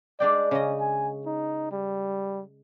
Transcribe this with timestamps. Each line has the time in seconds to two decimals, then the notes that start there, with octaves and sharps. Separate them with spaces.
0.20 G#3 D4 D5 G5
0.51 C#3 C#4 D#5
0.80 G#5
1.26 D#4
1.72 G3